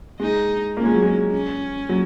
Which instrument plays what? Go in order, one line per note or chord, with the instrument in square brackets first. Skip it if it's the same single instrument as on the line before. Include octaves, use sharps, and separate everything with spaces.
[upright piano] G#3 [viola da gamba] D#4
[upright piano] A#3 [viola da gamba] C#4
[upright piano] G#3
F#3
G#3
[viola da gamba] C#4
[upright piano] F#3